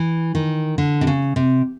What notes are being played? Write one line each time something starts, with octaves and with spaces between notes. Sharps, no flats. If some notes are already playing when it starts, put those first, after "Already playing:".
Already playing: E3
D#3
D3
C3
C#3
C3